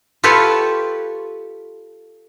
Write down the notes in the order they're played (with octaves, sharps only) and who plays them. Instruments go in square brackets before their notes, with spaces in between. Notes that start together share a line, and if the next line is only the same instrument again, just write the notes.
[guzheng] F4 G4 A4 B4 C#5